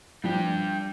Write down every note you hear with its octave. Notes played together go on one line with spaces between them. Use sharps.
F3 G3 D4 G4